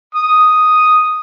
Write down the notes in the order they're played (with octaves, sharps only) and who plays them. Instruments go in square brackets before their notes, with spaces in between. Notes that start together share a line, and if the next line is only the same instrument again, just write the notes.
[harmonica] D#6